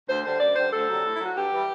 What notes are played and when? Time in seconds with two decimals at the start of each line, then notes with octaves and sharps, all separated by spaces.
0.08 D2 C5
0.24 D3 G3 C5
0.40 F#2 D5
0.55 D3 G3 C5
0.73 D2 A4
0.88 C3 F#3
1.04 A2
1.14 E4
1.20 F#3
1.25 F#4
1.35 G2 G4
1.52 E3 G3